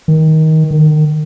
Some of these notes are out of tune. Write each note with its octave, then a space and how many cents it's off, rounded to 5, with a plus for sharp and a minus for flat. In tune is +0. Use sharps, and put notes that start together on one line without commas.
D#3 +20
D#3 -25